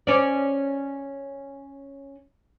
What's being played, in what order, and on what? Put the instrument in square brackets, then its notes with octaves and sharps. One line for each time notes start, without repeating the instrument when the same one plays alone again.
[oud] C#4 D5